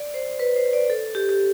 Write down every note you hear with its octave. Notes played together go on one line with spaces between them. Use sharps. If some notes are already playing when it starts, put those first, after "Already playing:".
Already playing: D5
C5
B4
C5
D5
A4
G4
G4